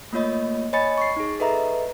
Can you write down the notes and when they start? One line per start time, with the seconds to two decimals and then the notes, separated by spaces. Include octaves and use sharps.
0.13 A3 A#3 F4 C#5 D#5
0.73 C#5 D#5 G#5 B5 A6 C#7
0.98 C#6 C7
1.17 D#4 G#4
1.40 A4 B4 D#5 E5 A#5